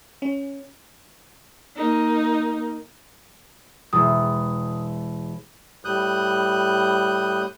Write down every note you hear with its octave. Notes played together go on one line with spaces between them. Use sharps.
C#4
A#3 D#4
E1 D#6
A2 G3 D#6 F#6 G6